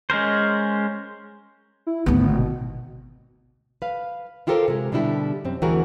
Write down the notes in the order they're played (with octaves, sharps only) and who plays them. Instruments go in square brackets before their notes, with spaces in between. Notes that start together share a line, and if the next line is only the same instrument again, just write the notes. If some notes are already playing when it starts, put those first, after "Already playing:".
[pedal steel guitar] G#3 C#4 A#4 C5
[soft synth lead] E4
[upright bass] G#1 D2 [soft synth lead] B3
[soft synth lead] B2
[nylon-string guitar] B4 F5
E4 F4 G4 A4 A#4 C5
C3 G#3
B2 D3 G3 D4 E4 G4
F#2 C4
D2 E3 C4 F#4 G#4 A#4